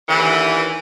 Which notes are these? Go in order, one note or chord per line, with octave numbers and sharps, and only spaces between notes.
D#2 D3 E3